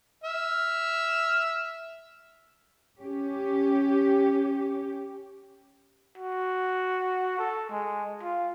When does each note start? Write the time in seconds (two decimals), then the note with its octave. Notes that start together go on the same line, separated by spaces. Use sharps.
0.24 E5 F6
3.02 C#4 G4
6.18 F#4
7.39 A4
7.71 G#3
8.23 F4